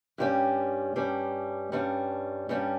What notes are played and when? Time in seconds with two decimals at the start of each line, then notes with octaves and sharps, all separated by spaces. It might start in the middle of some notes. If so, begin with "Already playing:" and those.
0.18 G2 G3 C#4
0.96 G2 G3 C#4
1.72 G2 G3 C#4
2.49 G2 G3 C#4